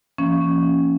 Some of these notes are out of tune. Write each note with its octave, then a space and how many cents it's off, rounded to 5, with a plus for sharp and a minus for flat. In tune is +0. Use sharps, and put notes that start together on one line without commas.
F3 -40 A#3 +0 C#4 +0